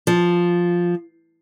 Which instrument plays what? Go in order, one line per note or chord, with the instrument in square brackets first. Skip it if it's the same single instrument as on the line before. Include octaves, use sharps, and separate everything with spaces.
[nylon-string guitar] F3